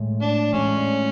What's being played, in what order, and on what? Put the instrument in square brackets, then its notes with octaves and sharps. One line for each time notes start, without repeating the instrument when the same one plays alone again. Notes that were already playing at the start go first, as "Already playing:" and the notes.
Already playing: [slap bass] A2 E3 G#3
[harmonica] D4
[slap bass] A2 E3 G#3 [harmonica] C#4